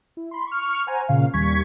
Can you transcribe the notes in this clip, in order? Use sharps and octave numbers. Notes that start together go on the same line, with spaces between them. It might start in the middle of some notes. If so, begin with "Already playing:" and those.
E4
B5 C6
C#6 F6
C5 F#5 G#5 A#5
A#2 C#3 F5
D#2 G3 C#6 G#6 B6